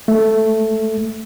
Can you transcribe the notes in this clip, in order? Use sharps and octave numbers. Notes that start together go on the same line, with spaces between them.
A3